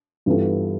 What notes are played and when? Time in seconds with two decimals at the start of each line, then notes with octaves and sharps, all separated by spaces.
0.26 G2 E3 B3 F4 A4